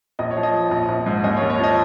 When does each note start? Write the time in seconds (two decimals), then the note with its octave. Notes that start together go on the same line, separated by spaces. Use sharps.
0.19 A#1 D#5
0.31 C#5
0.37 F3
0.43 D#5
0.54 F3
0.71 A#1
0.89 A#1
1.06 G#2
1.24 D#2 D#5
1.37 C#5
1.42 D#2
1.50 C#5
1.59 F3 D#5